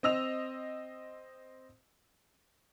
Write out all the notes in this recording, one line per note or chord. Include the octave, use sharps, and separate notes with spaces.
C4 D#5 E6 F7